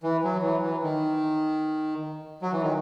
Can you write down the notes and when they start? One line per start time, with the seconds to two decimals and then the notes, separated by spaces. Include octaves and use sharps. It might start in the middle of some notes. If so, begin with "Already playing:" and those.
0.03 E3
0.24 F#3
0.42 E3
0.62 E3
0.83 D#3
2.42 F#3
2.52 E3
2.62 D#3